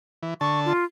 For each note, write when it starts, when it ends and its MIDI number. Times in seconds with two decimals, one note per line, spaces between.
0.23 0.34 52
0.41 0.73 50
0.41 0.73 81
0.41 0.60 85
0.65 0.85 65